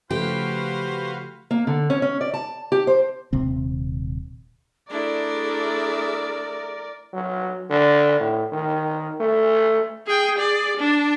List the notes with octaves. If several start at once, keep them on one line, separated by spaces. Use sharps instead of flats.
C#3 F3 A3 F#4 G4 B4 C5 F5
A#3
D3
C#4
C#4
D5
A5
G4
C5
D#1 C3 C4
A3 D4 E4 G#4 A#4 D5 E5
F#3
D3
A2
D#3
A3
G#4 G5
G#4 D5
D4